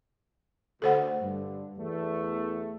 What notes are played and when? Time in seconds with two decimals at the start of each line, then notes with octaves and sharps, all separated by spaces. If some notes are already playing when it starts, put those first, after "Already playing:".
0.82 D2 A4 C5 F#5
1.21 G2 D3
1.78 E2 A3